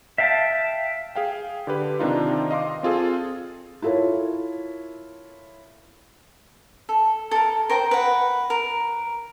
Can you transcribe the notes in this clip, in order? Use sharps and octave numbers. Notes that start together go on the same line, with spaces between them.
E5 F5 G5 A5
G#4 F5 G5
D3 G4 B4
C3 D#3 D4 D#4 F4
D#5 F5 C6 D6
C4 F4 G#4 A4
E4 F4 A4 A#4 C#5
A4
A4 A#4
A#4 C5 G5 A#5
B4 F#5
A#4